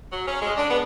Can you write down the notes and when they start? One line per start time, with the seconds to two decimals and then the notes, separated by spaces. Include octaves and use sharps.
0.12 F#3
0.28 C#4
0.41 G#3
0.57 D4
0.70 B3